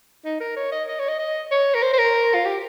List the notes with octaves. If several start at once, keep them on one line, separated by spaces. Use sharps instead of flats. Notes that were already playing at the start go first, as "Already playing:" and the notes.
D#4
A#4
C#5
D#5
D#5
C#5
D#5
D#5
C#5
A#4
C5
C5
A#4
F4
G4